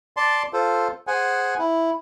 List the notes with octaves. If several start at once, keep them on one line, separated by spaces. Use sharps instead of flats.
D5 A5 C6
F4 A4 C5
G#4 C5 F#5 G#5
E4